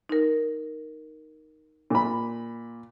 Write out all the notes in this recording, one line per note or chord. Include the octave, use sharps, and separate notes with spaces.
D#4 A#4
A#2 B5